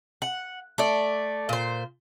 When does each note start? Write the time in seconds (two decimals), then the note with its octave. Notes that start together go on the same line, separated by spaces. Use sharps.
0.22 F#5
0.78 A3 D5
1.49 A#2 C5